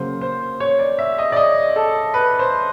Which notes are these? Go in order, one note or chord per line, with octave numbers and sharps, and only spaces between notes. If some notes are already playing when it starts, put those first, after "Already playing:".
Already playing: C#3 F#3 A#3 C5
C5
C#5
D5
E5
D#5
D5
D#5
A4
B4
C5